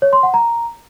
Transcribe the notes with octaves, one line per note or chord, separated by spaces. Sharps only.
C#5
C6
F#5
A#5